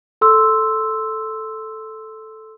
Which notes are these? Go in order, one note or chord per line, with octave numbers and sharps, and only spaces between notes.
A4 C6 E6